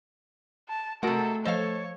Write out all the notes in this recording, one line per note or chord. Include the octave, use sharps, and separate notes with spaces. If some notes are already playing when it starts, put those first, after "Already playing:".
A5
C3 G#3 A3 F#4 A4 A#4 F#5
F3 A4 C5 C#5 D#5 F5